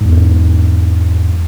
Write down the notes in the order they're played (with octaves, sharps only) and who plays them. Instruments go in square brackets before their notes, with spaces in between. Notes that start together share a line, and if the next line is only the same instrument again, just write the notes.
[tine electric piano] E2 G#2